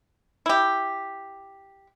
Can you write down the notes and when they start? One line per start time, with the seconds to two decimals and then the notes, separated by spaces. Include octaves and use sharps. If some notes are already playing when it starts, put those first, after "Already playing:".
0.46 E4 G4